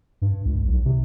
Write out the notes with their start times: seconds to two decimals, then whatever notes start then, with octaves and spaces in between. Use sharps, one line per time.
0.22 G2
0.45 C#2
0.65 B1
0.85 C3